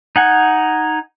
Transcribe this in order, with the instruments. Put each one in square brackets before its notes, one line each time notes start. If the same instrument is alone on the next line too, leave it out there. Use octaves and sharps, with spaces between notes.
[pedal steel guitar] D#4 F#5 G#5